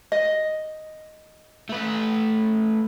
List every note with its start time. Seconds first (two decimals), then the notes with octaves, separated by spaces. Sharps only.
0.12 D#5
1.70 A3 B4